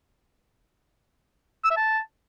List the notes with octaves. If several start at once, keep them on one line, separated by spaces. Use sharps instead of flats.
E6
E5
A5